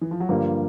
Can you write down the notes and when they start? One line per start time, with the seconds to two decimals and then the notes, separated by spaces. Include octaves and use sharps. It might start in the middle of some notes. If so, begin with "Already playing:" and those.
0.01 E3
0.11 F3
0.20 F#3
0.29 G2 D3 F3 G3 A#3